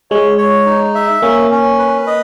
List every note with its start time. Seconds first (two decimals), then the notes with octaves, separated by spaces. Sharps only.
0.11 G#3 C#5
0.38 C#5
0.66 D#4
0.95 E5
1.22 A#3 C#4
1.51 C#4
1.79 B4
2.07 D#5